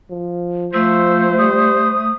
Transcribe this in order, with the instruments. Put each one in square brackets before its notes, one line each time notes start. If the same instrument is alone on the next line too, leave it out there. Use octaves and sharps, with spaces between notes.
[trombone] F3
[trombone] F3 [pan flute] A3 [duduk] C5 [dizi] E6
[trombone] G3 [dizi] D#6